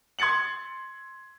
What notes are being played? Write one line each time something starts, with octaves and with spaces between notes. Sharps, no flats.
C6 G#6 A6 C#7 F#7